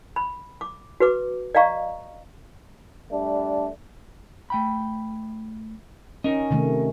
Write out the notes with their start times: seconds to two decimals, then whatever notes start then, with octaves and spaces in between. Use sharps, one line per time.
0.16 B5
0.61 D6
1.00 F#4 B4 D6
1.55 D5 D#5 F5 A#5 C#6
3.11 G3 A3 D4
4.50 A3 G5 B5
6.24 C#4 D#4 A#4 D#5
6.50 C3 D#3 A3